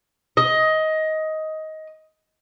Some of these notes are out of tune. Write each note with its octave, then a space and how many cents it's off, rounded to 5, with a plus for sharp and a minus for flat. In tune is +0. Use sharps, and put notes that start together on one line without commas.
D#5 +15